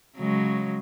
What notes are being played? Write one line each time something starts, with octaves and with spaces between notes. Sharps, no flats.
C#3 F#3 G#3